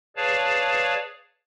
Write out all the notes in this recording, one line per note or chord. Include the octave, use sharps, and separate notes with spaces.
G#4 B4 C#5 D5 F5 A5